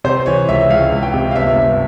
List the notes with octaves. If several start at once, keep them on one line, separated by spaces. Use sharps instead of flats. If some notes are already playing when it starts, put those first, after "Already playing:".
C3 C5
E3 C#5
C#2 E5
C#2 F5
C#2
G5
C3
F5
G1 E5
G2